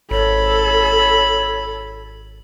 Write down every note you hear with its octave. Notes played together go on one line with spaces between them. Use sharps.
G#1 A4 C#5 B5